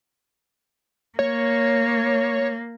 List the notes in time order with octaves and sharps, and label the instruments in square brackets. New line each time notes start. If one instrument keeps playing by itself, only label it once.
[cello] A#3 [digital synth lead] C#5